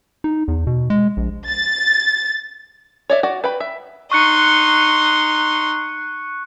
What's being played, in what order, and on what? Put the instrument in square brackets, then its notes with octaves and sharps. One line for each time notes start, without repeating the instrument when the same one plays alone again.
[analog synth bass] D#4
E2
B2
G#3
A#1
[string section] A6
[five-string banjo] C#5 D5 E5
F#4 D5
B4 G5 B5
E5
[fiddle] D#4 C6 [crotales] C#6 F#6 C#7